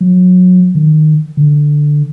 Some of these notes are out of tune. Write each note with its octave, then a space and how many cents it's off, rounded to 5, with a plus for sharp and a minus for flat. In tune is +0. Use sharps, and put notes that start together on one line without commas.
F#3 -25
D#3 -15
D3 +5